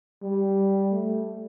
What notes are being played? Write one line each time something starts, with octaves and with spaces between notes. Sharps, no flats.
G3
A3